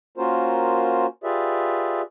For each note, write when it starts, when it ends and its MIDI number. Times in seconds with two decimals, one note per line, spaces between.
0.17 1.06 58
0.17 1.06 61
0.17 1.06 65
0.17 1.06 66
0.17 1.06 70
0.17 1.06 72
1.24 2.02 65
1.24 2.02 67
1.24 2.02 68
1.24 2.02 71
1.24 2.02 74
1.24 2.02 76